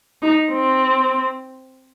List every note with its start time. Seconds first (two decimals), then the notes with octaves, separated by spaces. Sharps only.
0.22 D#4
0.53 C4